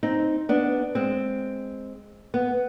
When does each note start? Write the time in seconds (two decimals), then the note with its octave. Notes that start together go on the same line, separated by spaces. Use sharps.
0.03 C4 D#4
0.49 B3 D4
0.95 G#3 C4
2.34 B3